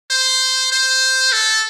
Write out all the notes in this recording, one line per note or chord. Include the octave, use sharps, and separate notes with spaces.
C5
C5
A4